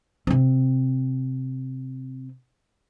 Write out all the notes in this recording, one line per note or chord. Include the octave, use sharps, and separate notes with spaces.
C3 C4